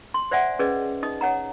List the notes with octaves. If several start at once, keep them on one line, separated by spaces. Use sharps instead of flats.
C6
C5 D5 E5 F#5 G#5
C#4 G#4 B4 D5 D#5
D#4 D#5 D#6
C#5 F#5 A#5